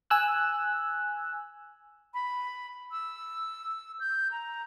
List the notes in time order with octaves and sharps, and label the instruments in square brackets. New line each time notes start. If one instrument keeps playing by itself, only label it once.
[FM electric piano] G#5 E6 F#6
[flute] B5
E6
G6
A#5